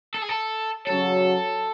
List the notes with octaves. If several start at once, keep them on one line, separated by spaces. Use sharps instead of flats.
A4
G#4
A4
C#3 F#3 C#4 F#4 A4 C#5